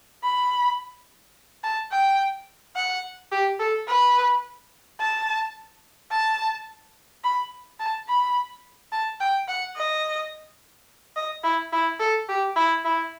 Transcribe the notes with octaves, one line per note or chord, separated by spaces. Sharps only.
B5
A5
G5
F#5
G4
A4
B4
A5
A5
B5
A5
B5
A5
G5
F#5
D#5
D#5
E4
E4
A4
G4
E4
E4